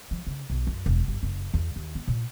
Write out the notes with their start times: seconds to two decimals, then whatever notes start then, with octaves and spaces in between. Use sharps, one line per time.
0.11 F3
0.27 C#3
0.50 B1
0.67 F#2
0.86 E1
1.08 G1
1.23 F#1
1.54 E2
1.76 D#2
1.95 B3
2.08 A#2